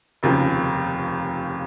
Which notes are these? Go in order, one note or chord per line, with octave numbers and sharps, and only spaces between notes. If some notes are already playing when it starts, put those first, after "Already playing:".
F1 D#2 C#3 F3